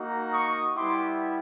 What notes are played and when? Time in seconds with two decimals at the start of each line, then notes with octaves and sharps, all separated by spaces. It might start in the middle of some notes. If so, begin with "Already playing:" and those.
Already playing: A#3 D#4 F#4
0.33 C#6 D#6
0.77 G3 B3 E4 G4 C6 D6